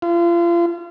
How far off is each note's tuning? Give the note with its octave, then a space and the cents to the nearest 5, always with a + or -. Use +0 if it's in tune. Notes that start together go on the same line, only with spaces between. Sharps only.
F4 -35